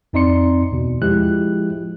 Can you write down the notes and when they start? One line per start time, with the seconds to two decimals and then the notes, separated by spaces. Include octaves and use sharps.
0.13 F2 C4 D#4 D5 C6 C#7
0.72 E2 B2
1.02 F3 G#3 E4 G4 F#6